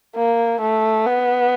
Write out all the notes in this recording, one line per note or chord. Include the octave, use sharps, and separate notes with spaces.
A#3
A3
B3